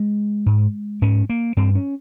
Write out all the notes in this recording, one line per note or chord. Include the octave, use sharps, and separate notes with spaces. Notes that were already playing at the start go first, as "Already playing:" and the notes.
Already playing: G#3
G#2
G#2 C#4
A#3
G2 C4
C#4